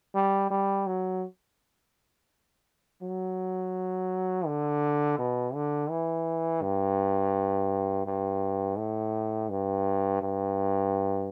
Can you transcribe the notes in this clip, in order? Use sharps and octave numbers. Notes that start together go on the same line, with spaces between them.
G3
G3
F#3
F#3
D3
B2
D3
E3
G2
G2
A2
G2
G2